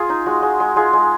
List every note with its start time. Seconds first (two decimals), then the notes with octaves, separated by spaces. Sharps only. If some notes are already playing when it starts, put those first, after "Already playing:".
Already playing: F4 G#4
0.09 D#4
0.26 G#3 F#4
0.42 G#3
0.60 G#3
0.76 G#3 F4 G#4
0.93 G#3